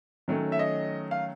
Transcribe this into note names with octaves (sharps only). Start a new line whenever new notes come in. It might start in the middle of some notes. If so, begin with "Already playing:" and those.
D#3 F#3 A3 C#4
E5
D#5
F5